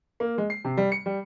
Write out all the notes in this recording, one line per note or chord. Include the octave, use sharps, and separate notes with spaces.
A#3
G#3
C7
C3
G3
C#7
G3